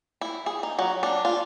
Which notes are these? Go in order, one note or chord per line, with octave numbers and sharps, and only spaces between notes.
E4
G#4
D#4
F#3
D4
F4